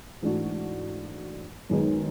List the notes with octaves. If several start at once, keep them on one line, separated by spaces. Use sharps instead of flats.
G#2 E3 A3 D4 F#4
F#2 D#3 G#3 B3 D#4